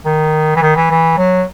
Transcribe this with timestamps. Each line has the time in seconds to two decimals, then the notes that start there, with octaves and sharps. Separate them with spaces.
0.05 D#3
0.56 E3
0.62 D#3
0.76 E3
0.90 E3
1.18 F#3